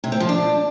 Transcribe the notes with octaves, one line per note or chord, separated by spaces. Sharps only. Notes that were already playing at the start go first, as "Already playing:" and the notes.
C3
C4
F3
D4